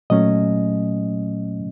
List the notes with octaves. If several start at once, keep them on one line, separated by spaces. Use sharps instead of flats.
A#2 F#3 A3 C#4 D#5